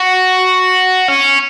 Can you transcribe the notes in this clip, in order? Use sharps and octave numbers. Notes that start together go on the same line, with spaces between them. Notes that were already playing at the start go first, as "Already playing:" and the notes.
Already playing: F#4
C#4